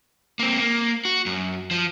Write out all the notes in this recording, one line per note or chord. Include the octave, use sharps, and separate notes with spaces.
A#3 C4
A#3
F#4
F#2
F3